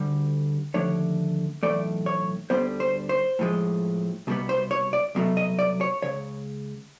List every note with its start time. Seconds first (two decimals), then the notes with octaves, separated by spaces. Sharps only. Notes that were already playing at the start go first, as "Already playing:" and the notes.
Already playing: D2 D3 G3
0.74 D#2 D3 F3 A3 C#5
1.63 B1 A2 E3 A3 D5
2.06 C#5
2.50 D2 D3 G3 B3 C5
2.80 C5
3.09 C5
3.39 A2 F3 G#3
4.27 C2 B2 G3 B3
4.49 C5
4.71 C#5
4.93 D5
5.15 C2 B2 F#3 A3
5.37 D#5
5.59 D5
5.81 C#5
6.02 C#2 C#3 C#5